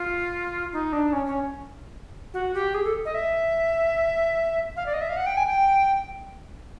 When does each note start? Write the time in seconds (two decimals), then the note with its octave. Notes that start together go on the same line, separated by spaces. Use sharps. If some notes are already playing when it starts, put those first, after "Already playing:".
Already playing: F4
0.73 D#4
0.93 D4
1.13 C#4
1.26 C#4
2.34 F#4
2.54 G4
2.74 G#4
2.84 A4
3.05 D#5
3.14 E5
4.76 F5
4.86 D5
4.93 D#5
5.01 E5
5.09 F5
5.16 F#5
5.26 G5
5.37 G#5
5.47 G5